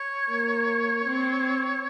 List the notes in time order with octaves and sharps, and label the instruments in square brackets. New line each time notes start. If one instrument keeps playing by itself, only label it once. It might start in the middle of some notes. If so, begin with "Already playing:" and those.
Already playing: [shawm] C#5
[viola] A#3
C4